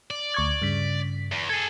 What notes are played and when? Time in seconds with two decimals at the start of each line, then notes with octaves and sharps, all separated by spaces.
0.11 D5
0.34 D2 C#6 G#6
0.62 G2 C#3 B6
1.32 E2
1.49 G#4 A4 G#6